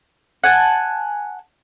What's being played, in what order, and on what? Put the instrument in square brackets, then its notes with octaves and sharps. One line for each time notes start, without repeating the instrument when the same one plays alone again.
[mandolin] F#5 G#5 A5